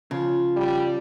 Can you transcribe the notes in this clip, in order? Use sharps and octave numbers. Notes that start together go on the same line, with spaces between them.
C#3 F3
G3